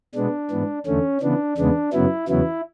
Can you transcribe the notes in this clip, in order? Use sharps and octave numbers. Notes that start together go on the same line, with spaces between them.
B2 G#3 B3 D4
G#2 E3 B3
E2 D3 A3 C#4
C#3 E3 B3 D4
E2 C#3 G#3 B3 D4
F#2 C#3 F#3 B3 E4
E2 C#3 F#3 B3 E4